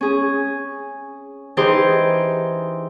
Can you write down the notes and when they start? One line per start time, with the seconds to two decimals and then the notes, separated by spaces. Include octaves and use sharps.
0.01 C#4 G#4
1.57 E3 D#4 G4 G#4 C5